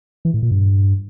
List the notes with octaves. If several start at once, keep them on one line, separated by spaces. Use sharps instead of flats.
E3
A2
A#2
G2